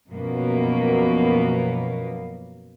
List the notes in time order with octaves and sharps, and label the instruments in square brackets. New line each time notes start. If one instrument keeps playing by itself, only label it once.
[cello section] F#2 B2 F3 A#3 B3